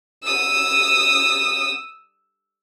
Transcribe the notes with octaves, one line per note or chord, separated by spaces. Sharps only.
D#6 E6